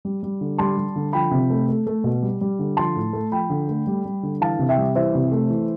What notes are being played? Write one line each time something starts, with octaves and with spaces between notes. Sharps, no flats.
G3
G3
D3
G3 A5 C6
G3
D3
F3 G5 B5
C3
A3
A3
A3
B2
G3
G3
D3
F3 A5 C6
A2
A3
F3 G5 B5
D3
A3
G3
G3
D3
E3 F5 A5
C3
E5 G5
G3
E3 C5 E5
C3
A3
E3